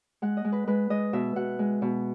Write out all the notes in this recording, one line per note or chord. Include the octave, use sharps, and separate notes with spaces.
G#3 F#5
D#5
G#3
B4
G#3 B4
G#3 D#5
B2 E5
B2 F#5
G#3
B2